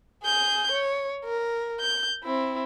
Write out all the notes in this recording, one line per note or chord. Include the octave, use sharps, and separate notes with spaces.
G#4 G6
C#5
A#4
G6
C4 E4